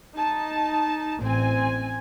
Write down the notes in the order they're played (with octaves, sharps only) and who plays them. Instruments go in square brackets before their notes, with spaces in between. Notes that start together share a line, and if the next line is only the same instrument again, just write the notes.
[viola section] D#4 A5
[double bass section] A1 [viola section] C4 G#5